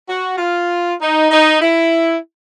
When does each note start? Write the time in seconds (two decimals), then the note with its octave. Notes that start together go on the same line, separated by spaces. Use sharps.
0.08 F#4
0.38 F4
1.01 D#4
1.31 D#4
1.61 E4